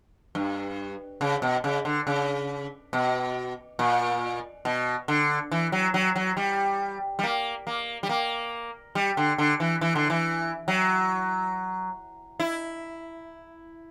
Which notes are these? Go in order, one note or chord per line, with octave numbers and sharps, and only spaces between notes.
G2
C#3
B2
C#3
D3
C#3
B2
A#2
B2
D3
E3
F#3
F#3
F#3
G3
G3
A#3
A#3
G3
A#3
G3
D3
D3
E3
E3
D3
E3
F#3
E4